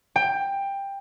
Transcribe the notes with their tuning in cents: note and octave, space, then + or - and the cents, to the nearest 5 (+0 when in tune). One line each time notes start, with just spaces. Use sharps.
G5 +15